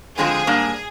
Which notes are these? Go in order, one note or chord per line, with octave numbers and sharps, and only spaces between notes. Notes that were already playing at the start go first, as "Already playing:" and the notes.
F2 D3 G#3 C4 F4 G#4
G#2 G3 A#3 D4